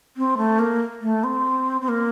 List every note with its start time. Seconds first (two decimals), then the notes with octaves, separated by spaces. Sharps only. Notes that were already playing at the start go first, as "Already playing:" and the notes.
0.17 C4
0.37 A3
0.59 A#3
1.02 A3
1.24 C4
1.81 C4
1.89 A#3